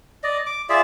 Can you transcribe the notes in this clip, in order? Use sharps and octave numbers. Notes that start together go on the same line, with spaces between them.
D5 D#5
D6
F4 G#4 D5 E5